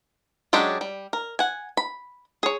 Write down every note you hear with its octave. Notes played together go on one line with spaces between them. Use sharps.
F#3 G#3 C#4 D4 G4
G3
A#4
F#5 G#5
B5
G#4 C#5